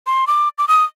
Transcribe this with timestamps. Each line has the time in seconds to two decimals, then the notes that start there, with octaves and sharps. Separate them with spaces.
0.07 C6
0.27 D6
0.58 D6
0.68 D#6